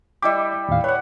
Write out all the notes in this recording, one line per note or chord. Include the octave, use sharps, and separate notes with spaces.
G3 E4 G4 D#5 D6
D#2 A2 F5
B4 C#5 F#5